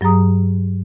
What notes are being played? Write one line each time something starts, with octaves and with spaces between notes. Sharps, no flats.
G2 F#3 G#4 A#5 D#6